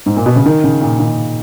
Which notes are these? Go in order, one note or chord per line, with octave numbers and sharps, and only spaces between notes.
G#2
A#2
B2
C#3
D#3
C#3
A#2
D#3